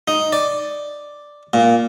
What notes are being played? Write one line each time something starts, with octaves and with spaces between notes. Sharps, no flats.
D#4
D5
A#2